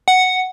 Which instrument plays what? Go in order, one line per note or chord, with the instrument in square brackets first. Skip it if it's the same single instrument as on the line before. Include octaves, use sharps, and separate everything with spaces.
[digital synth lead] F#5